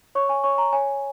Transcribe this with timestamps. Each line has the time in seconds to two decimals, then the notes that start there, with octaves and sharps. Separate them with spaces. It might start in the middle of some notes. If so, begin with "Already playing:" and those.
0.15 C#5 C#6
0.29 G#5
0.44 C#5 C#6
0.58 A#5
0.73 C#5 G#5